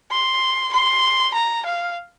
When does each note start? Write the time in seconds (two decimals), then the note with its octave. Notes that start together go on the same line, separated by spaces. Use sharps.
0.12 C6
0.73 C6
1.34 A#5
1.66 F5